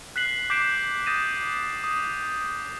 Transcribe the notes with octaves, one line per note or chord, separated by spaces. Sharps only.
F#6 B6 C7 F#7
D6 G6 B6 C7 D7 E7
D#6 G6 A6 A#6 D#7 E7
D#6